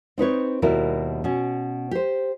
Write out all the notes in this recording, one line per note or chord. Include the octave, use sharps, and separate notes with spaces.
C4 D#4 B4 C#5
D#2 B2 G3 E4 A#4
B2 C#4
G4 C5